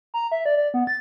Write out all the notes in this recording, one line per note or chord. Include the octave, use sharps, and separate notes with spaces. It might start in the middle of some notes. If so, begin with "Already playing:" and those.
A#5
E5
D5
D5
B3
A6